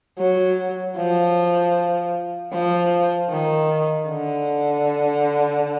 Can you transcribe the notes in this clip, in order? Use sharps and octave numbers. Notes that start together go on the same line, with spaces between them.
F#3
F3
F3
D#3
D3